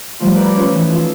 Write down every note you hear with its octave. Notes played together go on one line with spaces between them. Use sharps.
F3 G3 A3 F4
B4 D5 A#5 B5 D6
C#4 F4 B4 C#5
E3 D#4
F4 A4